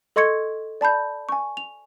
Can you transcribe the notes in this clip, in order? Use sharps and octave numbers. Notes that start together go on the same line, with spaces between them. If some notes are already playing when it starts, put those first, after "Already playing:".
A4 D#5 C6 C#6 G#6 C#7
D5 A5 B5 G6
G#5 C#6
F7